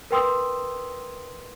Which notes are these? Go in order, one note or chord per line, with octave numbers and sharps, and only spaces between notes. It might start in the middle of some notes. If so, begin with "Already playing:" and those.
A#4 B4 G5 C6 D#6 E6